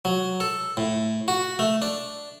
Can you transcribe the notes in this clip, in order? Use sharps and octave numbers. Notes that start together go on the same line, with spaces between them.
F#3
A4
A2
F#4
A3
D4